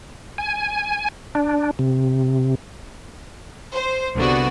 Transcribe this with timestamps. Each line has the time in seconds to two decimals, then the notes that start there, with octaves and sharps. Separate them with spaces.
0.38 G#5
1.35 D4
1.79 C3
3.73 C5
4.16 C2 D3 B3 F#4